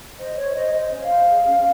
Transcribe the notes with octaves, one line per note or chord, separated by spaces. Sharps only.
C5 D#5
C5 C#5
C5 D#5
C5 D#5
C#4
F5
C5
G#4
C#4